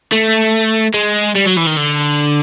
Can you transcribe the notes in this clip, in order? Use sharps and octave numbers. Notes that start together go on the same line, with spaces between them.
A3
G#3
G3
F#3
E3
D#3
D3